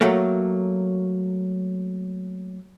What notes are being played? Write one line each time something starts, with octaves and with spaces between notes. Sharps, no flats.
F#3 A3 A#3